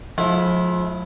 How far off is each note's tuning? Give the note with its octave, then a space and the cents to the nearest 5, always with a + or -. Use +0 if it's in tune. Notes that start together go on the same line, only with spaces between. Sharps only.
F3 +30 G#3 +45 E4 +0